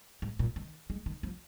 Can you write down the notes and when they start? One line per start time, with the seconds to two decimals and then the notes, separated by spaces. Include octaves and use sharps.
0.22 G#2
0.39 A#2
0.56 D#3
0.90 G#3
1.06 D#3
1.23 F3